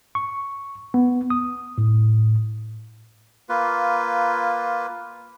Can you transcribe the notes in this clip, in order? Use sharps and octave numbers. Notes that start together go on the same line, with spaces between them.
C#6
B3
D#6
A2
A#3 F4 B4